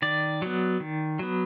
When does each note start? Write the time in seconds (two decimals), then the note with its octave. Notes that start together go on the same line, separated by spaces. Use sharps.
0.02 D#3 D5
0.42 F#3 B3
0.80 D#3
1.19 F#3 B3